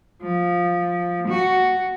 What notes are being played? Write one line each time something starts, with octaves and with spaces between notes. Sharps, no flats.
F3
F#4